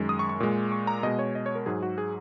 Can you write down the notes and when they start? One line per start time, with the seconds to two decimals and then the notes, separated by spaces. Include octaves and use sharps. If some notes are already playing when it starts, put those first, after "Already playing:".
Already playing: F#2 D#3 G#3
0.09 D#6
0.19 C#6
0.29 C#6
0.40 A#2 G#3
0.72 C#6
0.87 A#5
1.03 B2 G#3 D#5
1.19 C#5
1.35 D#5
1.46 C#5
1.55 A#4
1.66 G#2 F#3 G#4
1.83 F#4
1.98 G#4